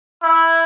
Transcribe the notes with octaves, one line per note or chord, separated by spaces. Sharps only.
E4